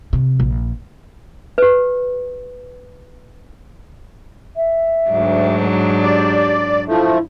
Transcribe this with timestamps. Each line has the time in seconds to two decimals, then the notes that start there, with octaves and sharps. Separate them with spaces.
0.13 C3
0.40 A#1
1.58 G4 B4
4.56 E5
5.10 D2 G#2 F#3 D4
6.03 G4 D5
6.88 F3 A3 E4